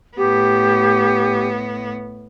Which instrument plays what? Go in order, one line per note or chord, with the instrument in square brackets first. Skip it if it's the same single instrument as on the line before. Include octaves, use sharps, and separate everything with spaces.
[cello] A2 B3 [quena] G4